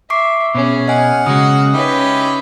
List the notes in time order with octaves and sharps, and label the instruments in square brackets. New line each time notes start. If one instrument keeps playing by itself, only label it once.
[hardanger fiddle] E5 [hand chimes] C#6 D6 C7
[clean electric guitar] B2 [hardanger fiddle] C#4 G#4
[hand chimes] D#5 G#5 [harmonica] F#5 F6
[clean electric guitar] C#3 G#3 [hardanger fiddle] F#4 [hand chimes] D#6
[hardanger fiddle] C#4 B4 [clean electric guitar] D#4 [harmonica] E4 G4 D#5